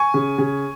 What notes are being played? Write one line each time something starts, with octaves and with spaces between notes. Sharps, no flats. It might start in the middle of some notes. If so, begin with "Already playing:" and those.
Already playing: G#5 C#6
C#3
C#3